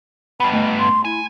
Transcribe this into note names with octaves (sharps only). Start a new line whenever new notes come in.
G2 B3 B5
A3 D#5
C6
E4 G#5